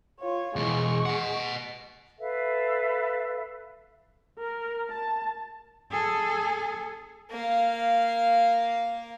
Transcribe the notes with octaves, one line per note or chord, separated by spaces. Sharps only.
F4 C#5
E2 B2 G#3 C#6
D#5 F#5
A4 B4 E5 F5
A#4
A5
G#4 A4
A#3 F5